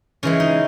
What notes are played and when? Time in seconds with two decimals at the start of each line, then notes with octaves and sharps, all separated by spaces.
0.23 C#3 E3 G#3 C#4
0.40 D#4